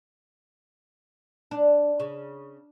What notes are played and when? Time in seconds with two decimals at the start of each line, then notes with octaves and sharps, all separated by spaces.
1.51 D4
2.00 C#3